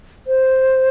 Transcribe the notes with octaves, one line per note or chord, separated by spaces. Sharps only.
C5